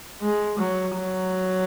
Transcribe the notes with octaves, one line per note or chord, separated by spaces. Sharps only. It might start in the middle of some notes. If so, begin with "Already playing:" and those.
G#3
F#3
F#3